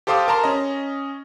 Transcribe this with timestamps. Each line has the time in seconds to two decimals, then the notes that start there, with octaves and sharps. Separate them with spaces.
0.07 G4 A4 C5 F5 D6 D#6
0.28 A#4 A5 A#5 C6
0.44 C#4 D#5